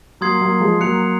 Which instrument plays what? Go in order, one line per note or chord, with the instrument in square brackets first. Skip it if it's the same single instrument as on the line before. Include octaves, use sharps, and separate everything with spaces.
[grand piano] F#3 A#3 [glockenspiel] C6 D#6 G#6 C7
[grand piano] F#3 A#3
F3 G#3
[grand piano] F#3 A#3 [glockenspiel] F#6 C#7 F7